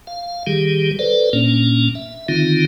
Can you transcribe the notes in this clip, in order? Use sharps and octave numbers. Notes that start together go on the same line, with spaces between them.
F5
D#3 G3 G4 G#4
A4 B4 C5 D5
A#2 A#3 C#4 D4
E5
D3 D#3 C4 D#4 F4